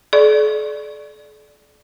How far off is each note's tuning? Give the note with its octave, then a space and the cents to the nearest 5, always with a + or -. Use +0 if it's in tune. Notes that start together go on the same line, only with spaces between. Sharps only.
A4 -45 D5 +0 C#6 +0